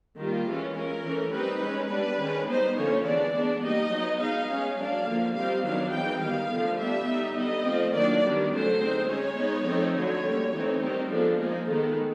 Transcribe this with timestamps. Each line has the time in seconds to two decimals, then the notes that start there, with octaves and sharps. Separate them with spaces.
0.18 D#3 G3 A#3 F4
0.48 E3 G#3 C#4
0.76 G#3 C#4 A#4
1.05 E3 A3 C#4
1.33 G3 C4 D#4 B4
1.63 G#3 C#4
1.91 G3 B3 D4 B4
2.20 D#3 G#3 C#4
2.48 G3 B3 D#4 C5
2.77 D3 F3 A#3 C#4 C#5
3.06 E3 G#3 B3 D4 D5
3.35 G#3 B3 D4
3.63 G3 A#3 D#4 D#5
3.92 F#3 B3 D#4
4.21 G#3 B3 D#4 F5
4.50 G#3 C#4
4.79 F#3 A#3 D4 F5
5.07 D3 F3 A#3
5.36 G3 C4 D#4 F5
5.64 D#3 F#3 B3 D4 F5
5.93 E3 G#3 C4 D#4 G5
6.22 D#3 G3 B3 F5
6.51 D3 F3 A3
6.80 G3 B3 D4 E5
7.08 G3 B3 D#4
7.37 D3 G3 B3 D#5
7.66 F3 A3 C4
7.94 D#3 F#3 A#3 D4 D5
8.23 D#3 G3 B3 D4
8.52 D3 F#3 A3 C#4 C5
8.80 G#3 C4 D#4
9.09 G#3 C#4 C#5
9.38 G#3 B3 D#4
9.67 F3 A3 C4 D#4
9.96 D3 F#3 A3 C#5
10.25 G3 A#3 C#4
10.53 E3 A3 C4 D#4
10.82 D#3 G3 C4 D#4
11.10 F3 G#3 B3 D4 A4
11.39 F3 A#3 D#4 G#4
11.68 D#3 G#3 B3 D#4 A4